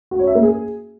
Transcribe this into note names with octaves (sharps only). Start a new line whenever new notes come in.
F#4
C#5
E5
A#3
G#4